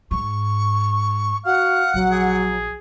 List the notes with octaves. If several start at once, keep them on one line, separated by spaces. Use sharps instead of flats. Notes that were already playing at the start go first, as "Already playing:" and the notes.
G#2 C#6
F#4 F5 F#5
A#1 F#3
G#4